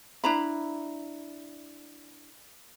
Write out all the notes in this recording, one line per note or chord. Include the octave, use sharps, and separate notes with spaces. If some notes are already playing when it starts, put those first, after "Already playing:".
D4 E4 A#5 B5